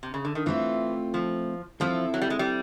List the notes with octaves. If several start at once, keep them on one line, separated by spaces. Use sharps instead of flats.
C3
C#3
D3
D#3
E3 A3 C4 F4
F3
F3 C4 E4 A4
F#3
G3
G#3
G3